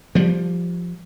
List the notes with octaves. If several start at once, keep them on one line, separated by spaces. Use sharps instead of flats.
F3 G3